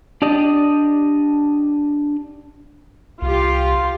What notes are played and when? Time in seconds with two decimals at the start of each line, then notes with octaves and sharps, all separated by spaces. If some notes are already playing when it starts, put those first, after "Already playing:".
0.22 D4 G4 D5 D#5
3.22 C2 F4 G4